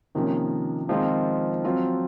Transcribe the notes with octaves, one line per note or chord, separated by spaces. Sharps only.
C3 D#3 F3 A#3 C#4
D#3 F3 G#3 C4 F4
F#3 C4 F4